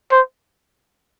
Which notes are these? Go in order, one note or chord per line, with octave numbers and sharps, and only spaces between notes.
C5